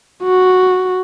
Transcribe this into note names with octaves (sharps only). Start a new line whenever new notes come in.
F#4